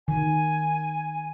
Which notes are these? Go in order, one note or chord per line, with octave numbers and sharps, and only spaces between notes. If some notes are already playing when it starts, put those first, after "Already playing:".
D#3 G#5